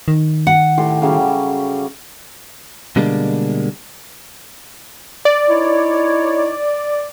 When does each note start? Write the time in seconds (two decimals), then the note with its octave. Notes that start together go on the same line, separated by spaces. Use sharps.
0.08 D#3
0.47 F#5
0.78 A2 G4 C6
1.02 C#3 F#3 G3
2.96 B2 D3 G3 G#3 A#3 D4
5.25 D5
5.48 D#4 E4 C#5